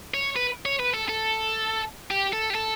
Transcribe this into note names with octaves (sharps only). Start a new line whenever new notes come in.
C#5
B4
C#5
B4
A4
A4
G4
A4
G4
A4